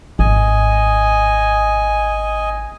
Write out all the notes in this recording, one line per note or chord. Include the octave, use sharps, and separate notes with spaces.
G#1 D#5 G#5